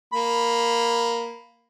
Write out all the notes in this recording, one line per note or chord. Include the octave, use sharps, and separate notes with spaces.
A#3 B5